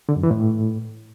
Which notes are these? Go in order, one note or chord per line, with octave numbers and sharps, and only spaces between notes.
D3
F#2
E3
A2